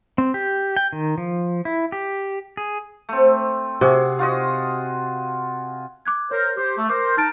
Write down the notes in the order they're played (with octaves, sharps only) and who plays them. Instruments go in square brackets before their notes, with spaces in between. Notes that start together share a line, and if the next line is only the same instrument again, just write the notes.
[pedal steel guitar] C4
G4
G5
D#3
F3
E4
G4
G#4
[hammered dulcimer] A3 C4
[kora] C3 [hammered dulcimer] F#4 G#4
[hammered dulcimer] F4 F#4 D#5
[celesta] D6 F#6 G#6
[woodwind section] A#4 C5 [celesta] C#5
[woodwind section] G4 C5 [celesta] D6
[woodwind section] A3
[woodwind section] A#4 C5 [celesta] D6
[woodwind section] D#4 A5 [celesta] F6 A6 D7